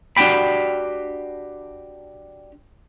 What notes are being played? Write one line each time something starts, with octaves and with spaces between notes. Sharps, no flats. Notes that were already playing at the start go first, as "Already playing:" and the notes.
D4 F#4 G4 G5 B5